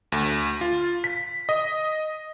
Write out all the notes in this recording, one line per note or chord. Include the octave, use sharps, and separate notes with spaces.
D2
F4
B6
D#5